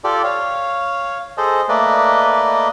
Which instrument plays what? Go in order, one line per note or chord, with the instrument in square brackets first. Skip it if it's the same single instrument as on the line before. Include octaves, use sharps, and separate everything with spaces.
[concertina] F4 G4 A4 D5
C#5 F5
G#4 A4 C5 D#5
A3 A#3 B4 D5 D#5